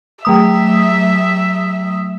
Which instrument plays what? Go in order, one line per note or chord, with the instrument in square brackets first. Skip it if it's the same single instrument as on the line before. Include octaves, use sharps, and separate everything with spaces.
[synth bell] F#3 A3 D#6 [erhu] E5